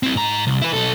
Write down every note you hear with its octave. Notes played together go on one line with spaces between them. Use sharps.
C4 E4
G#2 A#5
C2
E4 B4
B1 A4